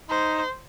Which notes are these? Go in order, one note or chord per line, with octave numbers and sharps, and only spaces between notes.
D#4 C5